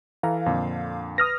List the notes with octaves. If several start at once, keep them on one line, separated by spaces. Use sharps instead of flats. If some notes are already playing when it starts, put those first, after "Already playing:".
E3 A4 F5 A#5
F2 A#2 D3
B4 D#6 F6 A#6